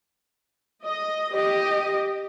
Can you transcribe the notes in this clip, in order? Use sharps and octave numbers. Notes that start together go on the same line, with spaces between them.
D#5
G4 D#5